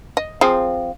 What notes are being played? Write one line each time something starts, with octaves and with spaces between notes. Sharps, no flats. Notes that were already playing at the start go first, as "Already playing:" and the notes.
D#5
F3 C4 G#4